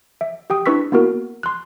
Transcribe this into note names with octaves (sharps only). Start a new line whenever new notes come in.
E5
G4 G5 D#6
D4 E4 B4 C#6 E6 B6
A#3 B3 E4 F#4 A#4
C6 F#6